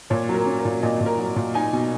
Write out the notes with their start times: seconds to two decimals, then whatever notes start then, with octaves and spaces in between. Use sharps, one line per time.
0.10 A#2 C#5
0.29 F#3
0.34 A#4
0.46 C#4
0.59 A#4
0.65 A#2
0.82 A#2 D#5
1.01 A#2
1.06 A#4
1.18 F#3
1.36 A#2
1.54 D#4 G#5
1.73 B2